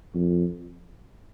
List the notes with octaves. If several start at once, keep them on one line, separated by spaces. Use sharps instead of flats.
F2